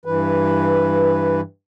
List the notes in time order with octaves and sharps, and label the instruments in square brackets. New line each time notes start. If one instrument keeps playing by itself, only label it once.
[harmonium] G2 E3 B4